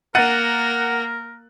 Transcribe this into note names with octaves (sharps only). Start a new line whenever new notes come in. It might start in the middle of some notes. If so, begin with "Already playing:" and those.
A#3 A#4 F#5 F#6 A6 D#7